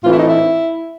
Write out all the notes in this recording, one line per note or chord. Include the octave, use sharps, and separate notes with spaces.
A2 E3 A3 C4 F4
E4
D#4
E4